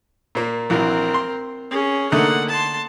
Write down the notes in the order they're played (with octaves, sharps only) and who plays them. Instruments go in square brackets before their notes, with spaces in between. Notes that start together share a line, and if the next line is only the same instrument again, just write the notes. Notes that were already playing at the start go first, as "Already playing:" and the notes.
[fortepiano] A#2 A#3
[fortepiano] A#1 E3 F#3 [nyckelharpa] C4 A#4
[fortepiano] C6
[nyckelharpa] C#4 G#4
[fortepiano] D3 A3 D#4 [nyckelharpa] A#3 F#5
[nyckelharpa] A5 C6